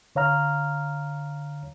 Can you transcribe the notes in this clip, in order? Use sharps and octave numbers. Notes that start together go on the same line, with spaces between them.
D3 C#5 F5 A#5 F6